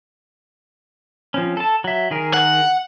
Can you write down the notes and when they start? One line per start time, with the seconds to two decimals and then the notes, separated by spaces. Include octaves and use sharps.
1.34 F3 C4 C#4
1.57 A4 A5
1.84 F#3 E5
2.11 D#3 G#4 A#4
2.34 F#5